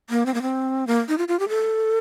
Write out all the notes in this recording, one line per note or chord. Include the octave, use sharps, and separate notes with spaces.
A#3
C4
A#3
C4
A#3
D#4
F4
F4
G4
A4